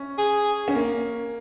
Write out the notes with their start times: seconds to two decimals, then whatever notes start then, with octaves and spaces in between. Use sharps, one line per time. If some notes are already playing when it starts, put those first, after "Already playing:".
Already playing: C#4
0.18 G#4
0.68 C#4
0.75 A#3